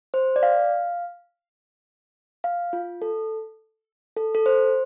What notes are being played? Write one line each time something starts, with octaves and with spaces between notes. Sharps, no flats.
C5
D5
F5
F5
F4
A4
A4
A4
C5